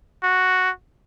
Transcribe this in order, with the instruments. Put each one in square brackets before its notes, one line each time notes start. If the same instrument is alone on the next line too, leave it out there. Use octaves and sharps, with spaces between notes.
[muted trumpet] F#4